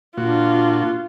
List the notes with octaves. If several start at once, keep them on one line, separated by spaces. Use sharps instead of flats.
A#2 D4 F4 F#4